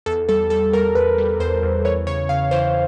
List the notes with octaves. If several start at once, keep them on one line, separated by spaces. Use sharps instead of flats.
E2 A4
G3 A4
G3 A4
G3 A#4
E2 B4
G3
E2 C5
E2
E3 C#5
C#3 C#5
C#3 F5
E3 C5